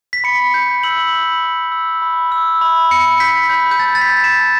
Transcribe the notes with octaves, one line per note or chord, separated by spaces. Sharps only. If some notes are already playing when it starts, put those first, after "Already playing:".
B6
B5 C#7
G6
E6 F#7
B5
E6
E6
B5
E6
B5
B5 C#7
G6 B6
B5 G6
G6
A5 A6
A6
B6
G6
E7
A5